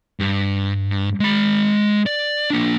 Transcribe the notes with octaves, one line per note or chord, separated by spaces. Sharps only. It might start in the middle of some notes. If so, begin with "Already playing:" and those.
G2
G#3 B5
D5
A#3 D4